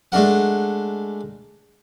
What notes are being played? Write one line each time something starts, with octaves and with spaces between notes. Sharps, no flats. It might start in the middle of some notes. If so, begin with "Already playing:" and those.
G#3 A3 D4 A#4 F#5